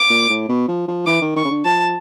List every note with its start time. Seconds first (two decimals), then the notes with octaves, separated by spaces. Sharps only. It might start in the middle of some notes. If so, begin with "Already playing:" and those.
Already playing: D6
0.10 A#2
0.30 A2
0.49 B2
0.68 F3
0.88 F3
1.06 E3 D6
1.22 D#3
1.36 D#3 C#6
1.45 C#3
1.51 D3
1.65 F3 A5